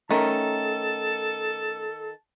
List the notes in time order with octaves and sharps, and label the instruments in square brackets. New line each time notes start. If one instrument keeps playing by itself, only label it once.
[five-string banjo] D#3 [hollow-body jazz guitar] A3 C#4 A#4 [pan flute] A4 [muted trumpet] A5